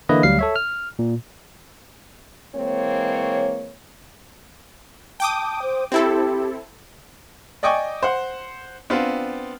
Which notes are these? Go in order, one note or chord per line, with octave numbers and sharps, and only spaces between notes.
D3 E3 A#3 E4 B4 D#5
D2 F#3 G3 F5 C7
A4 C#5 E5
F6
A#2
E3 G#3 A#3 C4 C#5
G5 A5 D6 D#6
C5
C4 E4 G4 A4
D5 D#5 G5 G#5 C#6 D6
C5 F#5
B3 C4 D4 F4